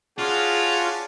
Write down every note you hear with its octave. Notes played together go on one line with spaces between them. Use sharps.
C#4 D4 F4 F#4 G#4